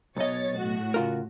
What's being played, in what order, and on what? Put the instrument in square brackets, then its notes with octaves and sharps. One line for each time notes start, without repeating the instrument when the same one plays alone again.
[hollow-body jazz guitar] B1 D#5 [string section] B2 C#5 A6
[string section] A2 F#4
[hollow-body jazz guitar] C#3 F4 A#4